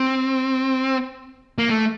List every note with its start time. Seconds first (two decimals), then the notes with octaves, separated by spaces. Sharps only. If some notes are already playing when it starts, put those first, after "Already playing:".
Already playing: C4
1.58 A#3
1.69 A3